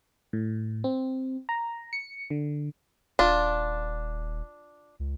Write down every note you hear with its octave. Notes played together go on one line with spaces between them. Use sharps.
A2
C4
A#5
C#7
D3
D#1 D4 F4
C#2